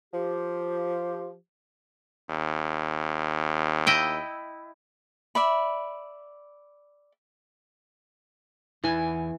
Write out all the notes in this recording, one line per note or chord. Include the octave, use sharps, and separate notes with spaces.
F3 G4
D#2
E4 D#5 G5
D5 E5 B5
E2 E3 G#5